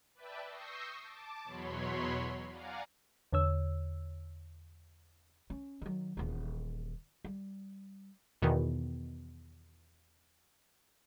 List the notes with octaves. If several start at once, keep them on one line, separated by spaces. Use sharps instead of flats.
B4 D5 E5 G5 A5
C#6 D#6 E6 G6 A#6 C7
A5 D6
E2 B2 F#3 C#5 B5 C6
D5 F5 F#5 G#5 A#5
E2 D3 C#5 E6
C#4
D#3 F#3
D#1 E2
G3
E2 B2 D#3